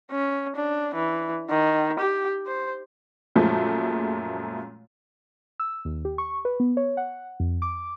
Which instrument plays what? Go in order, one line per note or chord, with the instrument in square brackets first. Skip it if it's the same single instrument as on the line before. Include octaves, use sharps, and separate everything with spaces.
[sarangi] C#4
D4
E3
D#3
G4
C5
[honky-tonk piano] F#2 A#2 F3 G#3 A3
[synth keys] E6
D#2
G4
C#6
B4
B3
C#5
F#5
F2
D6